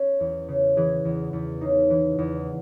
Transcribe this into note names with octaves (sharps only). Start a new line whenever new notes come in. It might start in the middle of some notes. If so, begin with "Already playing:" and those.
Already playing: C#4
E2
C#3
E3 G#4
E2
E2
C#3 D#4
E3
E2